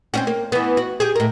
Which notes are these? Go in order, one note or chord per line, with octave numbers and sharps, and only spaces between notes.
C4 C#4 F#4
A#3
E3 B3
F#4
G4 G#4
A2 A#4